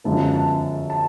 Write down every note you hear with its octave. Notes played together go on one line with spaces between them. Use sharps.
F#2 D3 F3 G#3 B3 A5
A5
A5